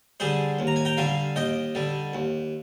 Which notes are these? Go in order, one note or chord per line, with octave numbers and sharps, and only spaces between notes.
D3 G3 G#4 C5
D#2
A#5
G#5
G5 A#5
D3 G3 F5 G#5
D#2 D#5 G5
D3 G3
D#2